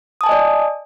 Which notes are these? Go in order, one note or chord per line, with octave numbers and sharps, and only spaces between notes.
D5 D#5 G#5 A5 D#6